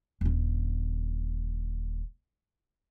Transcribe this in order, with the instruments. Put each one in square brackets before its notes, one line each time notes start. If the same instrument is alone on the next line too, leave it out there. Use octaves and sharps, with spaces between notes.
[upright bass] D#1 D3